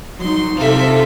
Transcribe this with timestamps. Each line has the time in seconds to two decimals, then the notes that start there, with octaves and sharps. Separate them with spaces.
0.21 F#3 D#4 C6
0.57 C3 F4 A4 E5